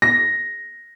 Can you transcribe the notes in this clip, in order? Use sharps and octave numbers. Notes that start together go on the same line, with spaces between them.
A#6